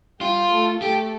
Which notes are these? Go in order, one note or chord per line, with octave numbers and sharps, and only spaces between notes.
G3 F4 G4
A3 A4
A3 G4 A4